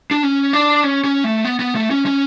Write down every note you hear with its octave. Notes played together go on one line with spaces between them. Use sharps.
D4
C#4
D4
C#4
C#4
A3
B3
B3
A3
C#4
C#4